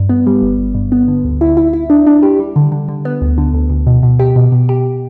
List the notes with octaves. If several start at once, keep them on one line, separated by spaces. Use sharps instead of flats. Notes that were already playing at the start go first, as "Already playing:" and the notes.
Already playing: G2
B3
G3
G1
G1
G2
B3
D3
D2
E4
E4
E4
D4
D4
G4
G3
D3
D3
D3
B3
D2
D3
D2
D2
B2
B2
G4
B2
B2
G4